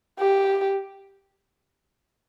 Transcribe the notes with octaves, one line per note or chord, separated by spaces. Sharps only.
G4